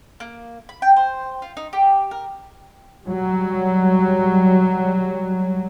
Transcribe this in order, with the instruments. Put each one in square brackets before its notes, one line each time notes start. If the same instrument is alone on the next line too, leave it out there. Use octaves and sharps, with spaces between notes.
[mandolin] A#3
B5
G5
C5
F4
D#4
G4
A#4
[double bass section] F#3 G3